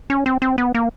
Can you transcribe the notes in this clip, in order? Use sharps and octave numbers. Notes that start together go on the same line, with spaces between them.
C#4
C4
C4
B3
A#3